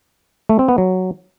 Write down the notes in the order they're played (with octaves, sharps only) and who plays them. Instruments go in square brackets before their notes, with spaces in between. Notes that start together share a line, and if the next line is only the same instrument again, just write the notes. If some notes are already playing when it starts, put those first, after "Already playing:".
[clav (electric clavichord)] A3
C4
B3
F#3